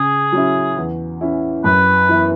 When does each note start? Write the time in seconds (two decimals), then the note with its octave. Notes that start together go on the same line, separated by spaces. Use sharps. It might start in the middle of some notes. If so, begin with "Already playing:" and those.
Already playing: C#3 G#4
0.32 F#3 C#4 E4
0.77 E2
1.21 E3 C#4 E4
1.64 F#2 B4
2.09 E3 B3 E4